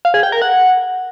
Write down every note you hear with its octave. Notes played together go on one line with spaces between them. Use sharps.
F5
G#4
G5
A#4
F#5